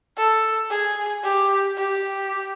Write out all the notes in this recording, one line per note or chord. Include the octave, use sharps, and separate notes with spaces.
A4
G#4
G4
G4